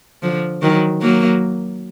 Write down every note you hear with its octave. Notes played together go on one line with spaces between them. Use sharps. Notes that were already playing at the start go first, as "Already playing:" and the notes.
D3 F3
D#3 F#3
F#3 A#3